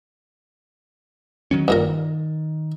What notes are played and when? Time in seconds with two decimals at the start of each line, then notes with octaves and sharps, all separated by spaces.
1.51 D#3 F#3 C#4
1.68 G2 A#2 D#3 A#4